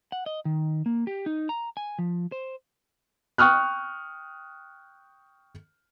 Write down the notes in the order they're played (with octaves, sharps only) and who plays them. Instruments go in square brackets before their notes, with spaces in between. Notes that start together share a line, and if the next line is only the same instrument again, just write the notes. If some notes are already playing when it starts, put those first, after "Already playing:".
[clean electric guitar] F#5
D#5
D#3
A#3
G4
D#4
A#5
G#5
F3
C5
[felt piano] G5 C#6 D#6 F6 F#6